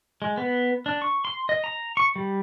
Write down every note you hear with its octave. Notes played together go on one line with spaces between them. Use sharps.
G#3
B3
D4
C#6
C6
D#5
A#5
C#6
G3